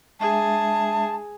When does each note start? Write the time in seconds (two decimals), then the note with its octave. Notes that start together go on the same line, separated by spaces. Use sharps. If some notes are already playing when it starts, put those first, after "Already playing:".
0.20 G#3 D4 G#4 E5 A5